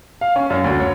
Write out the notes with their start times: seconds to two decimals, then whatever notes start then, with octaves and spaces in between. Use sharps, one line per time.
0.21 F5
0.36 C#4
0.50 F#2
0.64 D2
0.80 C#5